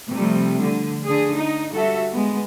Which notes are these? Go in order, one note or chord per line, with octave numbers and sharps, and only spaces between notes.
C3 F3 G3 A3
D3
D3 G#4
D#4
G3 F#4 A4 E5
G#3 B3